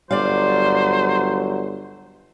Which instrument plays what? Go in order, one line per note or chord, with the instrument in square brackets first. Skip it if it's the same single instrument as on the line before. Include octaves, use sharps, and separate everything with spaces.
[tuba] G1 [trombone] F#3 [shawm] C5 [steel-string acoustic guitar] D5 F5